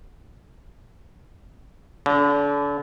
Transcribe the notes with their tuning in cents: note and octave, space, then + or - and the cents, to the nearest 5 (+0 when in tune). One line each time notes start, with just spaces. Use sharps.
D3 -35